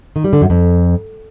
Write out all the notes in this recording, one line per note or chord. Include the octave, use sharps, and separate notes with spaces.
D#3
G3
D3
F#2
F2